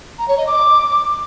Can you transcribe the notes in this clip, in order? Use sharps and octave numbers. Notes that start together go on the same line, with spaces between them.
A#5
C#5
D#5
D6